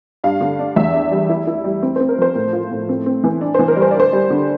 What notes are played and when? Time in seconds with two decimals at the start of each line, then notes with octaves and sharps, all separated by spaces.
0.24 G2 F5
0.41 D3
0.59 D4
0.76 E2 E5
0.93 D4
1.11 G3
1.29 E4
1.47 E4
1.64 G3
1.82 C4
1.96 C5
2.00 C4
2.09 A#4
2.18 F3 C5
2.35 A2
2.53 F4
2.71 A2
2.89 C4
3.06 C4
3.24 E3
3.41 D4
3.54 C5
3.59 E3
3.68 A#4
3.76 G3
3.82 C5
3.91 D3 D5
4.00 C5
4.13 G3
4.30 D3